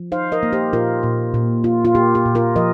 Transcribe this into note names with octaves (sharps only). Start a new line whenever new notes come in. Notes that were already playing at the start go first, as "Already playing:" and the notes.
Already playing: F3
D#4 C5 F5
A#4 D#5
A#3
G4 C5
A#2 F4 A#4
A#2
A#2
F4
F4
A#3 G4
G4
A#2
F4 A#4
F3 A#4 D#5